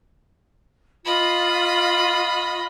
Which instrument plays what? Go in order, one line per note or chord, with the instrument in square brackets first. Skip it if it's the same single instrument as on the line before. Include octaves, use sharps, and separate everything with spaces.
[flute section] F4 [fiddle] D#5 B5